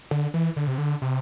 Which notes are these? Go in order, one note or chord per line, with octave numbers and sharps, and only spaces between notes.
D3
E3
D3
C3
D3
C3